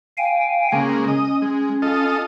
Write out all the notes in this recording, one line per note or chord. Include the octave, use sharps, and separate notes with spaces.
F5 G5 G#5
C#3 G#3 A#3 C#4
D#5
G#3
F4 A4 D#5